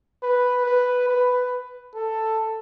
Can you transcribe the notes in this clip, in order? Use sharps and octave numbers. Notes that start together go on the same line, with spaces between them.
B4
B4
B4
A4